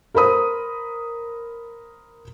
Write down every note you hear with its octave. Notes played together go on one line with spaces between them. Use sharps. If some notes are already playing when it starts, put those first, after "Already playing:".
A#4 C5 B5 D#6